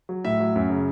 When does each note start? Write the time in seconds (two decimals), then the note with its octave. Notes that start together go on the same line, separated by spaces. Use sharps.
0.09 F#3
0.24 A2 E5
0.40 F#3
0.56 F#2
0.70 C#3